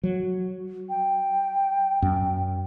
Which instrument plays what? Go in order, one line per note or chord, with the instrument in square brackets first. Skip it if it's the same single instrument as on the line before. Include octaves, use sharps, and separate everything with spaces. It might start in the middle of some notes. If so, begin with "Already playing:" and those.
[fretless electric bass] F#3
[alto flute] G5
[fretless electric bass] F#2